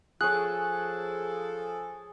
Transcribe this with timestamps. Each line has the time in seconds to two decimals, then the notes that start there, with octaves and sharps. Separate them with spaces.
0.21 F3 G#4 A4 C#5 F#6